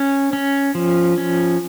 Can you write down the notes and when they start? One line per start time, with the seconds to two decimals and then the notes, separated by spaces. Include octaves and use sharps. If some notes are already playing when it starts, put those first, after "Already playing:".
Already playing: C#4
0.33 C#4
0.75 F3
1.18 C#4